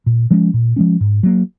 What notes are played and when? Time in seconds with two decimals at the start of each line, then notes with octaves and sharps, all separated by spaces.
0.06 A#2
0.31 F3 G#3 C#4
0.54 A#2
0.76 F3 G#3 C#4
1.00 G#2
1.23 F#3 A#3